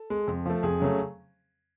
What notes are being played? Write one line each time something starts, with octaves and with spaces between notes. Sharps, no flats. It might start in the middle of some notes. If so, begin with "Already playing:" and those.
Already playing: A4
G#3
F2
F3 A3
F2 G#4
C#3 F#3 A3